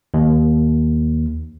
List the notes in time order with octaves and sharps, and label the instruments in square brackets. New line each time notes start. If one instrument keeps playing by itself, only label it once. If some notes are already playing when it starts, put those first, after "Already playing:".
[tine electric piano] D#2